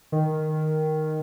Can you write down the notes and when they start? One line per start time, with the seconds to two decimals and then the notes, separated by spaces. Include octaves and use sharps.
0.12 D#3